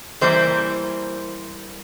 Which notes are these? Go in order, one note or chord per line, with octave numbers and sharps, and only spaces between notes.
E3 G3 A#3 C5